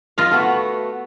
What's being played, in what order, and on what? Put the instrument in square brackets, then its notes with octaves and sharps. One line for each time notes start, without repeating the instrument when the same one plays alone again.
[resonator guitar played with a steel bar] F3 [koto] F4 D#5 F5
[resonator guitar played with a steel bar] A3 B3 F#4